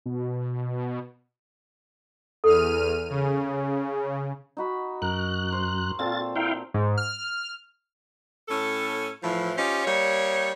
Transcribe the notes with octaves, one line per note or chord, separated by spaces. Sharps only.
B2
E2 A4 F6 D#7
C#3
D#4 F#4 B5
F#2 A#4 F#6
C5 A#5
A#2 C4 F4 A4 A6
E4 A#4 F5 G5
G#2
F6
A2 C#4 A4
A2 E3 F3
C#4 D#4 F4 G4 C5
G3 A#3 D#4 C#5